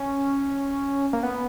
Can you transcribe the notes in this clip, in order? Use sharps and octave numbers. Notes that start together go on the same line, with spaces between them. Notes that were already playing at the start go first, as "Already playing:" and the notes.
Already playing: C#4
A#3
B3